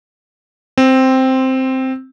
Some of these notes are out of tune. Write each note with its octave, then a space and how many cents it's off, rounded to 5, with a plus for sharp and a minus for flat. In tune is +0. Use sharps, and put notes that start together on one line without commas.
C4 +0